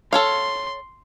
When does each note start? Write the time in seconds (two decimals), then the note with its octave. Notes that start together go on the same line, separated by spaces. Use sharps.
0.13 A4 C#5 F5 C6